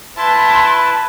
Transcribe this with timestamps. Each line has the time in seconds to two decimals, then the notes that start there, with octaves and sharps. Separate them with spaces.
0.18 E4 B4 A5 C6